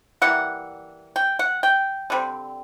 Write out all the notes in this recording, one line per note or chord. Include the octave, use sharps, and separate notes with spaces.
E3 G3 A#3 F#5
G5
F#5
G5
D3 G3 C4